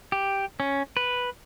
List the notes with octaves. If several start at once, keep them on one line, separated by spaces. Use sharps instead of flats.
G4
C#4
B4